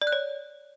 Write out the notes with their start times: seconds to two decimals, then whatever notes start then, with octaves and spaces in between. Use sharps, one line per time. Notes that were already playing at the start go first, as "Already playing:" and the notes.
0.02 D5
0.07 F#6
0.12 C#5